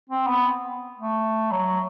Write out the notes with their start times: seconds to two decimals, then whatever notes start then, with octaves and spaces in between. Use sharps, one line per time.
0.09 C4
0.27 B3
0.98 A3
1.51 F#3